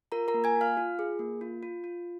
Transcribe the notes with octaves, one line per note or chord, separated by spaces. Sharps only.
F4 A#4 A#5
A#4 A#5
A#3
G#5 G#6
F4
F5 F6
F4
G#4
A#3
F4
F4
F4